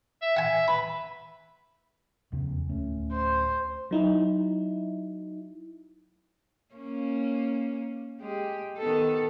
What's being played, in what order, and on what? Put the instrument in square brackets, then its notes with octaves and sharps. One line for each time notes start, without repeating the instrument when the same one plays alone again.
[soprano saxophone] E5
[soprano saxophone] E5 [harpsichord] F#5 G#5
[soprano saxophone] B4 [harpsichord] B5
[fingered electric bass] F1 E2 C#3
D1 A3 C#4
[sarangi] C5
[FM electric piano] F#3 D#4 E4
[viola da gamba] A#3 C#4
G#3 G4
D#3 B3 A4